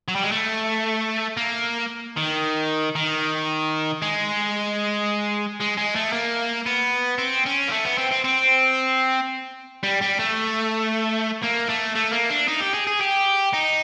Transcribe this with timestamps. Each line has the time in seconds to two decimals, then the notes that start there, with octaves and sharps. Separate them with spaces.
0.08 F#3
0.15 G3
0.24 G#3
0.32 A3
1.37 A#3
2.17 D#3
2.95 D#3
4.02 G#3
5.60 G#3
5.77 G#3
5.95 A3
6.13 A#3
6.66 B3
7.18 C4
7.45 C#4
7.68 A#3
7.71 A3
7.85 B3
7.98 C4
8.12 C4
8.24 C4
9.83 G3
10.01 G3
10.19 A3
11.43 A#3
11.69 A3
11.96 A3
12.13 A#3
12.30 D4
12.48 D#4
12.60 G4
12.74 G#4
12.87 G#4
13.01 G4
13.53 D#4